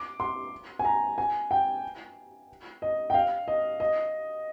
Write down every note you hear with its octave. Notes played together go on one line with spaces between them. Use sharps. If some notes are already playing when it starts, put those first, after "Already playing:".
Already playing: D6
C6
G#5
A#5
G#5
G5
D#5
G5
F5
D#5
D#5